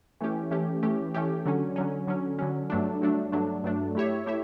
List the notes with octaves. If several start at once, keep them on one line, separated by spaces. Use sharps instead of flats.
E3 A3 C#4 G4
E3 A3 C#4 G4
E3 A3 C#4 G4
E3 A3 C#4 G4
D3 F#3 C#4
D3 F#3 C#4
D3 F#3 C#4
D3 F#3 C#4
G2 F#3 A3 D4
G2 F#3 A3 D4
G2 F#3 A3 D4
G2 F#3 A3 D4
A3 E4 G4 C#5 E5
A3 E4 G4 C#5 E5